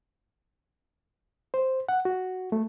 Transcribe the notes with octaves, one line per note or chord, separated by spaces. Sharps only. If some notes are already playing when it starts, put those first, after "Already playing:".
C5
F#5
F#4
A3